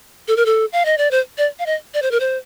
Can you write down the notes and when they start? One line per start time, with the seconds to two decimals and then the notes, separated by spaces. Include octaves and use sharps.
0.28 A4
0.36 A#4
0.46 A4
0.72 F5
0.85 D#5
0.98 D5
1.11 C5
1.38 D5
1.59 F5
1.66 D#5
1.94 D5
2.02 C5
2.11 A#4
2.20 C5